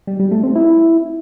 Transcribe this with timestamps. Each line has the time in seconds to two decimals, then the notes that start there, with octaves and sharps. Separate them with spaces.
0.07 G3
0.19 G3
0.31 A3
0.43 C4
0.55 E4